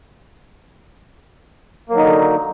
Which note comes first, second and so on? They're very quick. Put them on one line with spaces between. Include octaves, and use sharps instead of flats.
A#3 F#3 D#4 D3